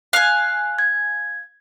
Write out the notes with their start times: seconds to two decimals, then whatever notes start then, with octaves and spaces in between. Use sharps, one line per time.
0.13 F5 G#5 F#6
0.79 G#6